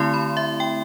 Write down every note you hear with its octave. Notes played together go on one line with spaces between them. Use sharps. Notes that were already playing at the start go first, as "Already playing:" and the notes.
Already playing: D3 A3 C4 E4 C6
B5
E5
G5